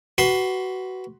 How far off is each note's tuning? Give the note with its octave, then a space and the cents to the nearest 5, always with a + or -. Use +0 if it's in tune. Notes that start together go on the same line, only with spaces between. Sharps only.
F#4 +20 B4 +0 C6 +15